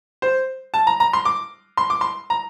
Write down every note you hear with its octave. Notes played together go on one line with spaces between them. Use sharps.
C5
A5
A#5
A#5
C6
D6
C6
D6
C6
A#5